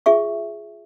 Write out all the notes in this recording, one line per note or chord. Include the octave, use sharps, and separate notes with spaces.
F4 G#4 E5 C#6